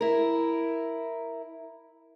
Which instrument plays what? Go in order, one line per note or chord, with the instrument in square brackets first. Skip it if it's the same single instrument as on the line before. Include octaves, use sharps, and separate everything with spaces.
[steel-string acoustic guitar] E4 A#4